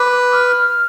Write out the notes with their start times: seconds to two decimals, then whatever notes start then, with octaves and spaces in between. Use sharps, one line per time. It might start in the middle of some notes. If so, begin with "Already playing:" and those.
Already playing: B4 D6
0.33 F6